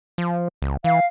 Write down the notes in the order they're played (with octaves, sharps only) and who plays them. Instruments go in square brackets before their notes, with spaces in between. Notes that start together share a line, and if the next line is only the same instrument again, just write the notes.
[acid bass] F3
C#2
[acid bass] E3 [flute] F5